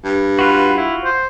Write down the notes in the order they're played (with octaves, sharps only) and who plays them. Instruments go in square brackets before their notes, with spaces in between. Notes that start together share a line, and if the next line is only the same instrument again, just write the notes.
[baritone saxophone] G2
[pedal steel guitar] F4 F#4 [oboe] B4
[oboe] E4
C5